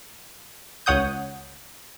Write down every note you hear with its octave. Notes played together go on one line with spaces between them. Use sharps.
C#2 C#5 F#5 D#6 G6